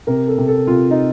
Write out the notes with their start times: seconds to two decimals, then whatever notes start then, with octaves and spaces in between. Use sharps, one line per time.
0.07 C3 A#4
0.28 A4
0.38 C3
0.48 A4
0.67 C3 F4
0.91 D#4